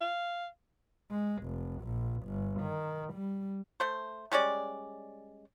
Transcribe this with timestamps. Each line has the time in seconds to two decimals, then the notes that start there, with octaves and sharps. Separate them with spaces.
0.01 F5
1.11 G#3
1.44 F1
1.83 A#1
2.24 G1
2.61 D#3
3.13 G3
3.80 A3 C5
4.32 G3 G#3 C#4 D5